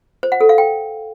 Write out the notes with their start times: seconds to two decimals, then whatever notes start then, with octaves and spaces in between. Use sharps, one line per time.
0.23 C5
0.32 F#5
0.41 A4
0.49 F5
0.58 G5